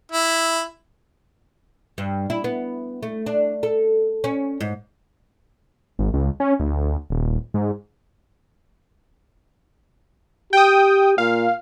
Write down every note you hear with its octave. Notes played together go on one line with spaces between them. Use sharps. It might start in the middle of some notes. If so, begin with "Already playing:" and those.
E4
G2
E4
B3
A3
D4
A4
C#4
G#2
G#1
C#2
C#4
D2
D#1
G#2
G4 G5 D#6
A#2 F5